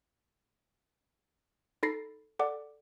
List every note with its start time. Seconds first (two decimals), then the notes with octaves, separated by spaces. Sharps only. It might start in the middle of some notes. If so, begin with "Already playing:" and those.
1.83 D#4 A4 B5 A6 A#6 C7
2.39 A4 D5 F#5 D6